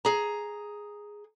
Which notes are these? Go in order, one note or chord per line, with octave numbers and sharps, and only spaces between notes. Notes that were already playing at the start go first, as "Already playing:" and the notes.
G#4 A#5